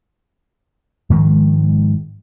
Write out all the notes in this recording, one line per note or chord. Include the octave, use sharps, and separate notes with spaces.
G#2 D#3 F3 G#3